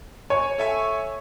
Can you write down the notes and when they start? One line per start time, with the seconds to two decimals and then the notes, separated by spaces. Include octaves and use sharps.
0.30 C#5 G#5
0.58 A4 E5 G#5